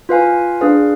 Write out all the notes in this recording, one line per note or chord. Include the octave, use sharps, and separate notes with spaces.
F4 B4 F5 G#5
D4 G#4 B4 F5